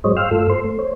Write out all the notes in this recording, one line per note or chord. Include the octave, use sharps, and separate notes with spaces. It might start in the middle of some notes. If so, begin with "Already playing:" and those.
G#2 F#3 G#3 C5 C#5 D#5
F5 G5 C6 E6 F6
G2 A3 F4 A4 E6
C5 C6
A3
C5 C#5